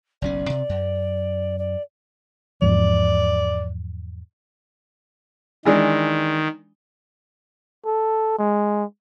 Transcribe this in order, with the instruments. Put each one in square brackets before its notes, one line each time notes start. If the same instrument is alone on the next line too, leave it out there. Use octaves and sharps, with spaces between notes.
[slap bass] F#1 B1 C#4 [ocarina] D5
[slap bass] C3
F#2
[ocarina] D5
[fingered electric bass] E2 G#2 F3 [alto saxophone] D5
[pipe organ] D#3 [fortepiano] E3 G#3 D4
[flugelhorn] A4
G#3